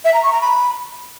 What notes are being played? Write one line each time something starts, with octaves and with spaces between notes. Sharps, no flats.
E5
A#5
C#6
A#5
B5